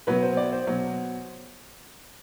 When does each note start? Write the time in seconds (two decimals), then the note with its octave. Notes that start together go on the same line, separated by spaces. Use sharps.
0.07 B2 F#3 B4
0.22 C5
0.37 D5
0.52 C5
0.67 B2 F#3